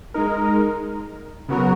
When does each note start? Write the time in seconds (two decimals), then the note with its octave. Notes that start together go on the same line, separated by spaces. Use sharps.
0.14 G#3 D#4 A#4
1.49 C#3 F#3 B3 F#4 A#4